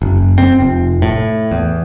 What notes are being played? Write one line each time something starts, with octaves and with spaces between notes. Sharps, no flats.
F#1
C4
F1
A2
E2